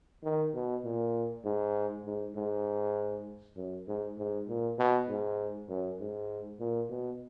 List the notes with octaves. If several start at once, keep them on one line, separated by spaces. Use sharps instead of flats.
D#3
B2
A#2
G#2
G#2
G#2
F#2
G#2
G#2
A#2
B2
G#2
F#2
G#2
A#2
B2